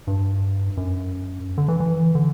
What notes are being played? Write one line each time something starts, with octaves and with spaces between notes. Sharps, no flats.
G2
F#2
D3
E3
E3
D3